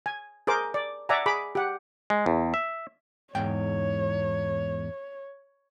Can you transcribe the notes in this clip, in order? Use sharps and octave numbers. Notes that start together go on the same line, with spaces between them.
G#5
G#4 A#4 C5 D6
D5
D5 E5 F#5 G#5 A#5
G#4 B5 D6
G4 F#5
G#3
E2
E5
E2 G#2 C#5 G5